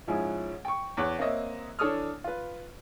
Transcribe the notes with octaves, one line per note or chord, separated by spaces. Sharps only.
G#2 F3 C#4 E4 G#4
G5 C#6
E2 C#5 D6 F#6
A#3 C4 C#5 D#5 E5
E3 D4 A4 C#5 D#6 F6
F4 B4